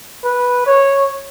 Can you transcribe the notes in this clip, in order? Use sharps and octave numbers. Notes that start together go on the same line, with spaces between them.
B4
C#5